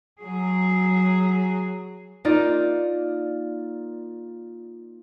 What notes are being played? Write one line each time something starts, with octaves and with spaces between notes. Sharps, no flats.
F#3 G#4
A#3 D#4 F4 D5